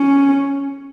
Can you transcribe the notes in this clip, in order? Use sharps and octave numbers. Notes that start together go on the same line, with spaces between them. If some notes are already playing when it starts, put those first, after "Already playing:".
Already playing: C#4